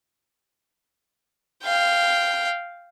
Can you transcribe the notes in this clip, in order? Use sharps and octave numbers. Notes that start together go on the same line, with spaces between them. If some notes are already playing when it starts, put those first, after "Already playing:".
F5 G5